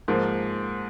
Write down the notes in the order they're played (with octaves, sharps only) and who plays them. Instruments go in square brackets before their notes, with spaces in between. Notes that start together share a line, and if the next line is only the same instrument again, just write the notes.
[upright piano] G#2 F3 A#3